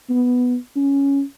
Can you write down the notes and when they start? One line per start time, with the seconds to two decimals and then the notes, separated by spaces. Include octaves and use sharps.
0.10 B3
0.76 C#4